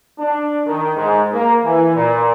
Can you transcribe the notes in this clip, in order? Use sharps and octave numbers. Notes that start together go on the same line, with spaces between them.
D4
D#3
G#2
A#3
E3
A#2